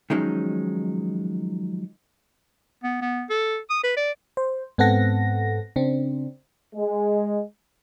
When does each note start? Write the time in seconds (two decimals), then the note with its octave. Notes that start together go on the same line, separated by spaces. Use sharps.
0.10 D#3 F3 F#3 G#3 C#4 D#4
2.84 B3
3.02 B3
3.30 A4
3.70 D#6
3.83 B4
3.97 D5
4.37 C5
4.78 G#2 B3 C4 A4 F#5 A#6
5.76 C#3 C4 D4
6.75 G#3